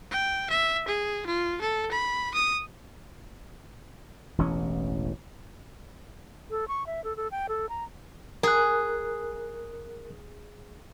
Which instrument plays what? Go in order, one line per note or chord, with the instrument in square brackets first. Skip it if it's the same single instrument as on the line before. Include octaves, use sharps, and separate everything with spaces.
[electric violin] G5
E5
G#4
F4
A4
B5
D#6
[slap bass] E1 A1 E3 C#4
[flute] A4
C#6
E5
A4
A4
G5
A4
A#5
[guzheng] G#4 [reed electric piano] A#4 F#6